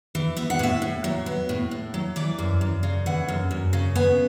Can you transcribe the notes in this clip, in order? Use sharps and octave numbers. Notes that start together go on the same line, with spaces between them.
E3
B3 E5
F#5
A2 E5
A2
F#3
B3
A2
A2
F#3
E3 D5
F#2
F#2
C#3
E3 F#5
F#2
F#2
C#3
B3 G#5